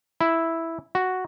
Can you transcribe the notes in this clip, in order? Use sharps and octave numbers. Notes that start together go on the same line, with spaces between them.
E4
F#4